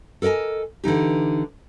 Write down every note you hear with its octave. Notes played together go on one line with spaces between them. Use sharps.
A4 A#4 D5 D#5 G#5
D3 E3 D#4 G4